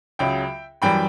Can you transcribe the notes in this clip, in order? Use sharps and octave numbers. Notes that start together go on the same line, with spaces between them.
C#2 C#3 F#3 E5 G5
F#2 E3 G3 G5 B5